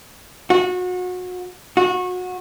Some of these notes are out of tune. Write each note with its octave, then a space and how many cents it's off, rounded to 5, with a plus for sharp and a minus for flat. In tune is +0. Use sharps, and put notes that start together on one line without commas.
F#4 -30
F#4 -25